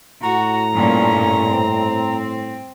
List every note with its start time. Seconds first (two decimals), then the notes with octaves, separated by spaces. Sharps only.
0.23 A2 F#4 A#5
0.74 G2 A#2 C#4
1.46 C4